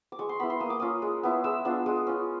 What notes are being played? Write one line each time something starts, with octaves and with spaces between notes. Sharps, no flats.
D6
G#3 C#6
C6
B3 E4 B5
C6
A#3 D#6
D6
C#4 F4 D#6
G#3
B3 E4
G#3 E6
B3 D4 F4
G#3 D#6
C#4 F4